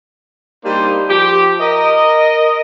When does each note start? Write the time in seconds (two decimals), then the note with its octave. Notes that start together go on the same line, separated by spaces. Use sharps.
0.63 G3 A#3 D4 D#4 C5
1.08 F3 G4
1.59 A#4 D#5